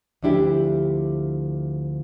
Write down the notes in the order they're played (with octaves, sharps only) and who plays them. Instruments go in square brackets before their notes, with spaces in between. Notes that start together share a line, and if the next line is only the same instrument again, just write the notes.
[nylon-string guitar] D2 F3 D4 E4 G4